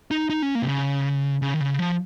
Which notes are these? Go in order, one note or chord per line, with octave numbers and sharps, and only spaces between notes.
D#4
D#4
C#4
A#3
C3
C#3
C#3
D#3
C#3
F3